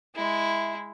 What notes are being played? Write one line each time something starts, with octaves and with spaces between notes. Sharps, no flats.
G#3 E4